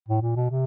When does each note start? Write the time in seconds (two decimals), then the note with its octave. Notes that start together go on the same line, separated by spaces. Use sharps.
0.08 A2
0.22 A#2
0.36 B2
0.50 C3